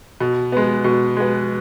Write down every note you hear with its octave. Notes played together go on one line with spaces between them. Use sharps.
B2
G#3 B3
B2
G#3 B3